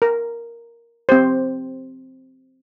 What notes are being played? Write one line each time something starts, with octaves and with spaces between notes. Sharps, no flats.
A#4
C4 G4 C5